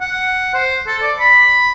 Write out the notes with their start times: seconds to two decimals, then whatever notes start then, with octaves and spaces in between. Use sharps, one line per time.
0.01 F#5
0.54 C5
0.87 A4
1.02 D5
1.19 B5